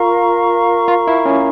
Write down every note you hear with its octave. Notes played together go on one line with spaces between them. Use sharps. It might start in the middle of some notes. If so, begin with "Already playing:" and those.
Already playing: F4 A#4 F5 A#5 C#6
F4
E4
C#4